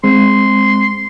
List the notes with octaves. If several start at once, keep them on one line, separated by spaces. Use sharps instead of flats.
G#3 C4 C6